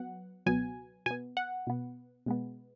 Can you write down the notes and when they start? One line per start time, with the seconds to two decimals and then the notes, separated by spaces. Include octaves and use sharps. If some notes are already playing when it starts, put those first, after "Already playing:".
Already playing: F#3 B3 F#5
0.46 C#2 B2 F#3 B3 G#5
1.06 B2 G#5
1.11 B3
1.37 F#5
1.67 B2 B3
2.26 B2 G#3 B3